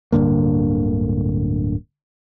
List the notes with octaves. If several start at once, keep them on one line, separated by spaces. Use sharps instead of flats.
D1 G2 D3 A#3